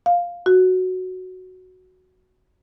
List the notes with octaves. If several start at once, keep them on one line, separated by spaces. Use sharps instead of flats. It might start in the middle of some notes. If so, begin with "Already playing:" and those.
F5
F#4